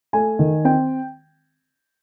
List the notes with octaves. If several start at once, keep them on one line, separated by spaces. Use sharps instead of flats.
A3 G#5
D#3
C4 G5